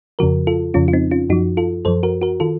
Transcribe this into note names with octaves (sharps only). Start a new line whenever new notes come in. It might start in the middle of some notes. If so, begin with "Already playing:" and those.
F2 C#3 F3 F#4 A#4
F4 A4
F2 C#3 F3 C#4 F4
F4
C4 D#4
C#4 F4
F#2 F3 D#4 F#4
F4 A4
F#2 F3 A4 C5
F#4 A#4
F#4 A#4
D#3 F4 A4